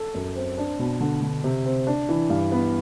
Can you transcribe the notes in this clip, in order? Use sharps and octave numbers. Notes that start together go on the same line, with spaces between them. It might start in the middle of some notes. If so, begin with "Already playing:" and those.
Already playing: A4
F#2
C4
D4
B2
D3
D3
C3
C4
D4
E3
G2
B3